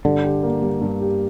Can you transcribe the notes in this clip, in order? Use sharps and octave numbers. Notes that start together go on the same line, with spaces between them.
G2 D3
G4
A#3
G3
G2
G4